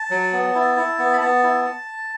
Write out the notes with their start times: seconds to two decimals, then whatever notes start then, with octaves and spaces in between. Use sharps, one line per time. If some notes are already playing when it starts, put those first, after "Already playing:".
Already playing: A5
0.10 F#3
0.33 B3
0.55 E4
0.77 E4
0.99 B3
1.13 B5
1.21 B3 A5
1.43 E4